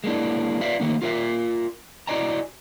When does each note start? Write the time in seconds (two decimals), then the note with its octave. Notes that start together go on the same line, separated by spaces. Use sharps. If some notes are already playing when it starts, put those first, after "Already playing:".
0.04 G#3 A#3 D4 E4
0.61 F4 B4 D5 E5 F5
0.80 D#3 A3 A#3 D#4
1.02 F4 F#4 A#4 C5 E5 F5
2.07 E4 F#4 D5 D#5 G#5 A#5